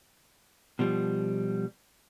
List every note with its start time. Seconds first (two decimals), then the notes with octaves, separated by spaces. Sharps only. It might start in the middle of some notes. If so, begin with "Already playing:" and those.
0.79 B2 F3 G3